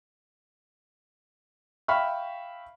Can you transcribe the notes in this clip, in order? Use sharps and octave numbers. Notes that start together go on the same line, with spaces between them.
E5 F5 G5 B5 C#6 F6